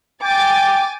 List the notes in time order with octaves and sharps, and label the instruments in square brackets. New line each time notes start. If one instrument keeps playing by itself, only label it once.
[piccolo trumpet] G5 [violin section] G#5 D6 A6